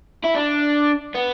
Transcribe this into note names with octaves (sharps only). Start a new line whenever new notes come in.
E4
D4
B3